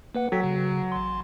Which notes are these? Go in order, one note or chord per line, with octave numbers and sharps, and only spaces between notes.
A#3 B4 F#5
F#3 A4 G5 B6
C#3
A1 C6